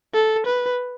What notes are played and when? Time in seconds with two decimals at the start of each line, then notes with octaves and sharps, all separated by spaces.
0.14 A4
0.46 B4